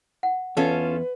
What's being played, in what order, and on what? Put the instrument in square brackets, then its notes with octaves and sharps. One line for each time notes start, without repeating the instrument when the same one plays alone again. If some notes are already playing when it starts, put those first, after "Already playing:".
[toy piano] F#5
[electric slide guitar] E2 [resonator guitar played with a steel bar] C#4 F4 A4 [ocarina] B4